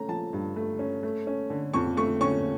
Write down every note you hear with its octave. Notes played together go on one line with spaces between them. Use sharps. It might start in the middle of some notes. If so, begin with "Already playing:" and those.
Already playing: A3 C#4 A#5
F3 A5
G2
A3
C#4
A3
C#4
D3
F2 C#6
A3 C#6
C#4 C#6